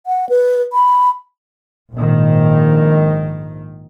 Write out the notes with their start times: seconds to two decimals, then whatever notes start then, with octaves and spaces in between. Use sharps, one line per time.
0.06 F#5
0.29 B4
0.73 B5
1.95 A#1 G#2 D#3